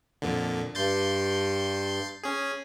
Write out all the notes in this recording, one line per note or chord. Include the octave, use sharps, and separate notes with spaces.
F2 A#2 D3
G2 C6 G6 A6
C#4 G#4